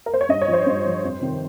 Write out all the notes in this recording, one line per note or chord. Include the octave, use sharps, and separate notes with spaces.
A#4
C5
C#5
G2 D#5
C#5
F3
C5
G2
F3
F2
C3 D#3